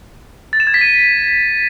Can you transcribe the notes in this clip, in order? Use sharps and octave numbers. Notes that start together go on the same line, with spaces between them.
A6
E7
G#6
B6
D#7